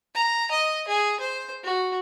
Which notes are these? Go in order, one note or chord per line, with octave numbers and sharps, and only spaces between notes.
A#5
D#5
G#4
C5
F#4